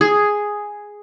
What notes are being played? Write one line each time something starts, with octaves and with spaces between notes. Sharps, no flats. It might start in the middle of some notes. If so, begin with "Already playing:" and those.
G#4